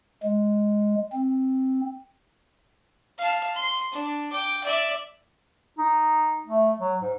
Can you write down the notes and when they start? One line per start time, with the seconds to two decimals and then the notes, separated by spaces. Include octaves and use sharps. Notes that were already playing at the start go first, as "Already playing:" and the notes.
0.23 G#3
1.12 C4
3.18 F5 A5
3.55 C6
3.91 D4
4.31 G5 D6
4.64 D5 E5
5.79 D#4
6.47 A3
6.79 F#3
7.02 G#2